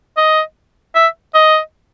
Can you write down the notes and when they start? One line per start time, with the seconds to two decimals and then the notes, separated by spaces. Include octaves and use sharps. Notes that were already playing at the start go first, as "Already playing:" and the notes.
0.17 D#5
0.95 E5
1.35 D#5